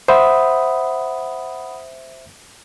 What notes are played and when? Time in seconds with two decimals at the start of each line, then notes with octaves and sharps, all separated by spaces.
0.08 C5 E5 F#5 B5 D#6